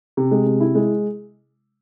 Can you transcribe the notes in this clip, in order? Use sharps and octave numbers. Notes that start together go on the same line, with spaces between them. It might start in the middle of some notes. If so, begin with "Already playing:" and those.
C3
G#3
C3
E4
G#3